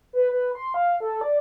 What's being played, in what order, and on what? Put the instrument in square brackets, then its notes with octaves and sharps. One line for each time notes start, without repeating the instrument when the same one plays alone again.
[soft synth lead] B4
B4
C6
F5
A4
D5